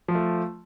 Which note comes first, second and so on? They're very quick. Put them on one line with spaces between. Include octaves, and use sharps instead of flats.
F3 F4 A3